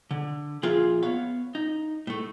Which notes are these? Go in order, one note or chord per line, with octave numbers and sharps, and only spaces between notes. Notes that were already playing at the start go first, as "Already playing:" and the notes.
D3
A#2 F3 F4 G#4 E5 F5
B3 C#5 F5
D#4
A2 A3